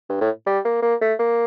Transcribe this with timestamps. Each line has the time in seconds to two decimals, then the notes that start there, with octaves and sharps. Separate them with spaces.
0.09 G2
0.21 A2
0.46 G3
0.65 A#3
0.82 A#3
1.01 A3
1.19 A#3